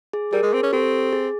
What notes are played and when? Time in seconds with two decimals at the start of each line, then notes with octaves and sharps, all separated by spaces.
0.13 G#4
0.33 G3 G#4 A#4
0.43 G#3
0.53 C4
0.63 C#4
0.73 C4 G4 A4
1.13 G#4